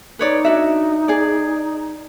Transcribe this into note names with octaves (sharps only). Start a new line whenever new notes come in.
D#4 B4 C#5 D5
D4 F#4 E5
G#4 D5